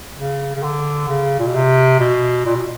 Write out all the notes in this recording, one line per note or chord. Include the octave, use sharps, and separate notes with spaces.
C#3
C#3
D3
C#3
A#2
B2
C3
B2
A#2
B2